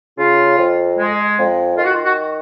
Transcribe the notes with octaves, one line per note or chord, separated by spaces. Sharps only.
C#3 F4
F2
G#3
F2
D#3 F4
F#4
F4
F#4